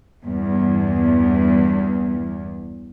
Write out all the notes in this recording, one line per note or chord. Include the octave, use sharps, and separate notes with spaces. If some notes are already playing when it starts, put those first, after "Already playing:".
E2 G2